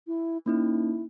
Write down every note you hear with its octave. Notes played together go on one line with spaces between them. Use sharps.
E4
A#3 C#4 D#4 E4